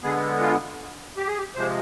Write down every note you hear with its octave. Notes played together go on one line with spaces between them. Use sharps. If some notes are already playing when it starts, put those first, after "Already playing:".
D3 G#3 B3 G#4
F4
G4
G#4
G4
C3 F3 G#3 C5